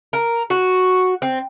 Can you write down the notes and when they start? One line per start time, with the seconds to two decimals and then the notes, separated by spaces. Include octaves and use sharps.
0.13 A#4
0.50 F#4
1.22 C4